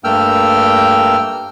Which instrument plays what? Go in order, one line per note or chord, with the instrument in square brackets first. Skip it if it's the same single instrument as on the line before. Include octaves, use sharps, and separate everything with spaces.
[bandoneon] G2 A3 A#3 G5 E6 F6